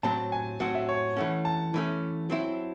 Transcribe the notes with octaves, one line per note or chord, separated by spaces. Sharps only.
A2 F#3 C4 F#4 A5
G#5
A2 F#3 C4 F#4 F#5
E5
C#5
E3 A3 C#4 F#5
A5
E3 A3 C#4
F#3 C4 E4